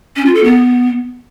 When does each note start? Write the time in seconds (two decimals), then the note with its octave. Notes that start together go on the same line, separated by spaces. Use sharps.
0.16 C#4
0.25 F4
0.35 A4
0.44 B3